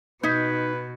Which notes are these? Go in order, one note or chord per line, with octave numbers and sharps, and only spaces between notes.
B2 D#4 B4 G6 G#6 B6